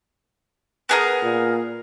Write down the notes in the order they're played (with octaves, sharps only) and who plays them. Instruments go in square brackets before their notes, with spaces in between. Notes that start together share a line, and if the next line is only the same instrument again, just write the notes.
[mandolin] B3 G#4 A#4
[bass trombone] A#2